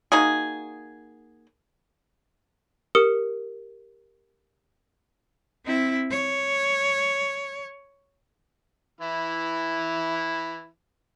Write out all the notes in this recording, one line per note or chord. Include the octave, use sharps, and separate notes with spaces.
A#3 D#4 F#4 G#4
G4 A#4 D#6 C#7
C4 E4
C#5
E3 E4